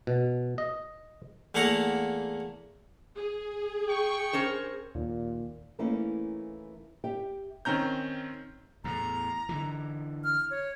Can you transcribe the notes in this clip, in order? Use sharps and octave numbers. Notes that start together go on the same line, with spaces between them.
B2
D#5
E2 A3 A#3 F5 F#5 A#5
G#4
G5 C#6
C#4 A#4 C5
D#2 A#2
E3 A3 A#3 C#4 D#4 E4
G4 E5 G5
D#3 C4 C#4 A#5 G6
E2 A2 A#5
D3 E3
F6
C#5